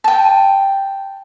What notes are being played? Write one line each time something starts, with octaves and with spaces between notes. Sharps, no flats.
G5 A5